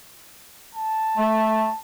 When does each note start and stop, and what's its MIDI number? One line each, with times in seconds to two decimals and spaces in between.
0.75 1.79 81
1.17 1.67 57